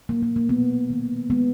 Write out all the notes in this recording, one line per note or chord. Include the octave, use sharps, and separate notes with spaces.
A#2 F#3 A#3
A#3
A#3
B2 F#3 A#3 B3
D#3 A#3
D#3 G#3 B3